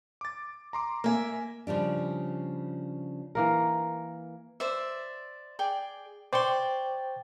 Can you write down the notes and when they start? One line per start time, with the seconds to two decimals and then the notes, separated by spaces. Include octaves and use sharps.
0.21 D6 A6
0.73 A#5 C6 D6
1.04 A#3 A#4 E5 G#5
1.67 C#3 F3 G3 D4
3.35 E3 A#3 A#4
4.60 C5 D5 E5
5.59 G#4 D5 G5
6.33 C5 D5 G5 C6 C#6